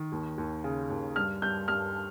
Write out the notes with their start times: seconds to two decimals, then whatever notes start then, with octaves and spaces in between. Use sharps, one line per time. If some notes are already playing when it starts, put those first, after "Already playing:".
Already playing: D#3
0.12 D#2
0.38 D#2
0.64 C#3
0.90 D#2
1.16 G2 F6
1.42 G2 G6
1.68 G2 F6